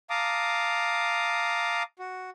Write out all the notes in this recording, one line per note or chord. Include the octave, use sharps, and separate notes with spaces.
F5 A5 A#5 D6 D#6
F#4